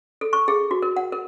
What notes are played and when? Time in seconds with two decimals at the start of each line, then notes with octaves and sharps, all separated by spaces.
0.21 A4
0.33 C#6
0.48 G#4
0.71 F#4
0.82 A#4
0.96 F#5
1.12 A#4